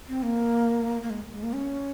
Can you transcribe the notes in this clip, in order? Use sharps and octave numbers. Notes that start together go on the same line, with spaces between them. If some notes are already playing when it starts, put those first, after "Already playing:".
C4
A#3
A#3
G#3
G#3
A#3
C#4